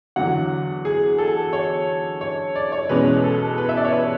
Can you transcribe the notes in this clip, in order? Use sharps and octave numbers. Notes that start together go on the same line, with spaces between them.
E2 D3 F#3 F#5
G#4
A4
C#5
C#5
D5
C#5
E2 B2 G#3 C#4 B4
A4
B4
E5
D5
C#5
B4